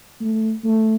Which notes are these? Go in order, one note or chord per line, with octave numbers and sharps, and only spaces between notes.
A3
A3